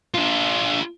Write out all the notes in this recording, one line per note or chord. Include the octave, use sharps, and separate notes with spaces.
D4 F4